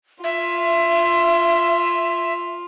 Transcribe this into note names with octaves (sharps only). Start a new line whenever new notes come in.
F4 E5